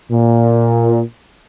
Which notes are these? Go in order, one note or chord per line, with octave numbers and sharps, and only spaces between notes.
A#2